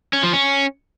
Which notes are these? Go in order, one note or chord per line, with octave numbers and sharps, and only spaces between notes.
C#4
F3
C#4